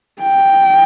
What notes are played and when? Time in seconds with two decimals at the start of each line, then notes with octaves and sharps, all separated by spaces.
0.22 G5